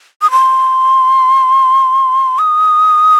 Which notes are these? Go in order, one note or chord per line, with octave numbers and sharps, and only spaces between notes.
D#6
C6
D#6